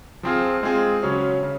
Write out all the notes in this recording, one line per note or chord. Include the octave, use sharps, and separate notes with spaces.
F3 C4 F4 G#4
G#3 C4 F4 G#4
C#3 F#3 C#4
C#3